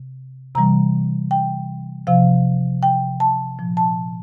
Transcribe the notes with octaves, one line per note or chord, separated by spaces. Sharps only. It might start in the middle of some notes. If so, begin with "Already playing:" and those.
Already playing: C3
C3 E3 G3 A#5
G5
C3 F3 F5
G5
A5
A#2 F3
A5